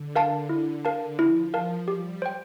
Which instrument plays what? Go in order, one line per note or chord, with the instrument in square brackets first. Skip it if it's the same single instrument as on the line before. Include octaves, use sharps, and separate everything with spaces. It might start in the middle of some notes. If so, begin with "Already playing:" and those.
Already playing: [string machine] D3
[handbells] A#4 F5 A5
E4
A#4 F5 A5
[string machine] F3 [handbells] E4
[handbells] A#4 F5 A5
[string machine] G3 [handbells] G4
[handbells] C5 G5